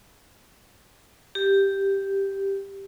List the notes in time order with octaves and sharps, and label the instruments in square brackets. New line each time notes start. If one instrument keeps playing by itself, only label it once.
[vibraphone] G4